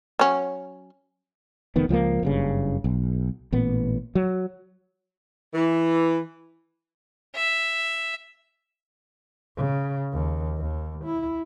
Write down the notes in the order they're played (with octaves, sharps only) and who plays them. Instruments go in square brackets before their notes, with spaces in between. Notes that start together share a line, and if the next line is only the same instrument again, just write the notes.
[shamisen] F#3 C#4
[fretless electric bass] F1 D#3 B3
C#2 F3 F#3 A#3
F#1 G2 C#3
B1
A1 A#2 B3
F#3
[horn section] E3
[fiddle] E5
[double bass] C#3
D#2
D#2
E4